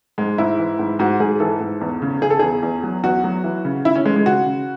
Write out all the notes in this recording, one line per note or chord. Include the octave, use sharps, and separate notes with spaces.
G#2 G#3
G#2 E4
E3
G#2
G#2 F#4
G#2 G#4
E3 A4
G#2
E2
C#3
C#3 G#4
A4
E2 G#4
E2
F#3
E2 F#4
F#3
E3
C#3
C#3 E4
C#4
E3 G#3
G#3
C#3 F#4
C#3